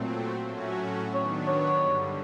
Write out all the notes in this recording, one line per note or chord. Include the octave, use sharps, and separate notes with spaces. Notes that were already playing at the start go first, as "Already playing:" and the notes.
Already playing: A#2 F#3 A3 C4
A2 F#3 A3 C#4 F#4
D#3 F#3 B3 D4 C#5
C#5
G2 D3 G3